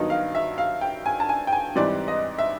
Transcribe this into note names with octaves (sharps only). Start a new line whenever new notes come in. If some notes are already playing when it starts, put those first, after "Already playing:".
Already playing: G2 D#3 F#3 B3 D#4
F5
E5
F5
G5
G#5
A5
G#5
G5
G#5
G#2 E3 G3 C4 D5
D#5
E5